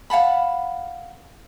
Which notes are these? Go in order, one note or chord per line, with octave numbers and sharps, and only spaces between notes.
F5 F#5 A5 B5